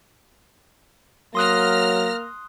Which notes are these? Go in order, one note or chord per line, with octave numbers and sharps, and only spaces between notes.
F#3 A#3 C6 D#6 F6 F#6 A#6